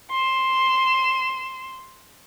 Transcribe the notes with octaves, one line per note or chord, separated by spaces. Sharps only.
C6 E7